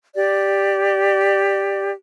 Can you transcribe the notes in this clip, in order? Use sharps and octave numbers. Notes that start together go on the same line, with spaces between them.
G4 D5